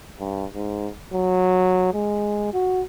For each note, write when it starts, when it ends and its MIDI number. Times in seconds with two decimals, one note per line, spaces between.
0.20 0.45 43
0.54 0.90 44
1.14 1.90 54
1.94 2.50 56
2.53 2.83 66